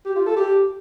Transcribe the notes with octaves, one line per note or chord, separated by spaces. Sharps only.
G4
F4
A4
G4